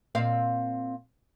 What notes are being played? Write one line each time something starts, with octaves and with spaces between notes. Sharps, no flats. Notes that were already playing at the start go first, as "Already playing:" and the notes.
A#2 C4 F5